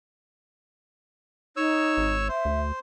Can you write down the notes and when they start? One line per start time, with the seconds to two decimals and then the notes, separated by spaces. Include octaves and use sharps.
1.57 D#4 C#5 E6
1.98 G#1
2.28 C5 E5
2.45 D2